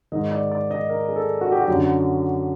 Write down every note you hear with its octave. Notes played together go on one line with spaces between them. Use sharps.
G#2 D#3 D#5
D5
D5
D#5
A#4
G#4
A4
F#4
G4
F#4
F#2 D3